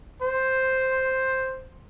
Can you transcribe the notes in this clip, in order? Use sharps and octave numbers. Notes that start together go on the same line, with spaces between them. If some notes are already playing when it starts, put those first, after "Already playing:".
C5